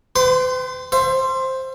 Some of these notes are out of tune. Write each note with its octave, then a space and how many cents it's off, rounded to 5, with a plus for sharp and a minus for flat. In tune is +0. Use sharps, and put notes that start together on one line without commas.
B4 +45 G5 +5 C6 -15
C5 +5 E5 +45